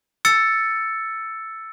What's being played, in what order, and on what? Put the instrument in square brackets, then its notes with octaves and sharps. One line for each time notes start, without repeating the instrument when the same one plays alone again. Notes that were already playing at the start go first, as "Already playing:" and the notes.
[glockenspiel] E6 A6 C#7